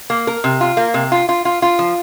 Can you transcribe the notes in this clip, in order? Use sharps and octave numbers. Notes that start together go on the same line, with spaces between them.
A#3
A#4
C3
F4
A#3
C3
F4
F4
F4
F4
F3